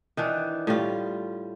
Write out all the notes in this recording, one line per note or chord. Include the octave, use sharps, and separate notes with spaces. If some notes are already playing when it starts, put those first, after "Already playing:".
D#3 E3 D4
A2 G3 F4